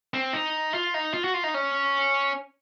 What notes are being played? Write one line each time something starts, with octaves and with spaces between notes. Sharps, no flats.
C4
D#4
F4
D#4
F4
F#4
F4
D#4
C#4